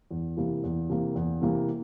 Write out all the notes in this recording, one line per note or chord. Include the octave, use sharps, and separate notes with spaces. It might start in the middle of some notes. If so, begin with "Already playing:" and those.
E2
C3 E3 A#3
E2
C3 E3 A#3
E2
C3 E3 A#3